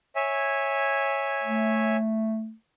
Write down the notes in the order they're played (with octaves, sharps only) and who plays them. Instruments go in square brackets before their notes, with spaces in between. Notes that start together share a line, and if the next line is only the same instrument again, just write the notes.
[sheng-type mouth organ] C#5 E5 G#5
[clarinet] A3